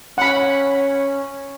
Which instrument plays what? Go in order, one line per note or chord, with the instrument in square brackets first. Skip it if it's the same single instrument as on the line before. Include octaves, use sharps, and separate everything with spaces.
[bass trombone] C#4 [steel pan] F#5 B5